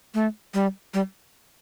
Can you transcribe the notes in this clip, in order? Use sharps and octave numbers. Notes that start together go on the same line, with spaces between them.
A3
G3
G3